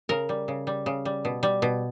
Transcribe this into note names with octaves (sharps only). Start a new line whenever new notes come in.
C#3 A#4
G3
C#3
G3
C#3
G3
B2
G3
B2